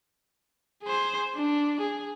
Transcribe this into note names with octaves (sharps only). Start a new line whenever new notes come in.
G#4 C5
D4
G#4